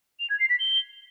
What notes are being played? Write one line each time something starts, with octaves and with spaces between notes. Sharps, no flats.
F7
G#6
C7
B6
G7